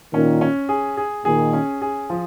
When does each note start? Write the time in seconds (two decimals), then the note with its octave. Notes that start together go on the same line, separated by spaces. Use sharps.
0.13 A#2 D#3 C#4
0.41 C#4
0.69 G#4
0.97 G#4
1.25 A#2 D#3 G#4
1.53 C#4
1.82 G#4
2.10 F3